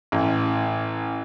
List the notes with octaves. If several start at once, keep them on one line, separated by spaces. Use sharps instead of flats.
A1